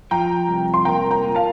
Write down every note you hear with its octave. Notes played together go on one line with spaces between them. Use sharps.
F3 G5 A#5
C2
C6
A#3 G5 A#5
G5 A#5
A#2
F5 A5